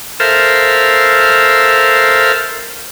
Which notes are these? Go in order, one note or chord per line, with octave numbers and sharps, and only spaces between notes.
A4 A#4 C5 E5 F5